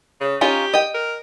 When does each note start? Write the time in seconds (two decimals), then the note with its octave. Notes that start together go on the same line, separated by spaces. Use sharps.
0.21 C#3
0.41 C#4 D#4 F4 G4
0.74 D#5 G5
0.94 A#4